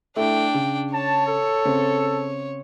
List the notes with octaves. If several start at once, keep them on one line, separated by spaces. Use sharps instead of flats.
A3 D4 E4 G5
C#3
C#5 A5
A4
C#3 C4